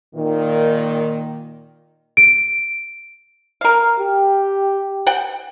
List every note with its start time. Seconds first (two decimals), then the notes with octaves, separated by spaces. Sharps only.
0.15 A#2 D#3
2.17 D7
3.61 A#4 F5
4.00 G4
5.07 F#5 G5